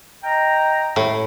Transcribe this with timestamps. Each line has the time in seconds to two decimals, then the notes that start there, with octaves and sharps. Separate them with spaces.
0.23 D#5 G5 A#5
0.96 A2